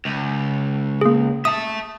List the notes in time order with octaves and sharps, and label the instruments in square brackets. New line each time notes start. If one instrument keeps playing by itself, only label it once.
[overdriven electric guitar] C#2
[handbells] A#3 G#4
[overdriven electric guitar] E5 A5 [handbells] D#6